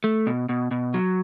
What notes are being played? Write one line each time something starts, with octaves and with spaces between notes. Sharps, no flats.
A3
B2
B2
B2
F#3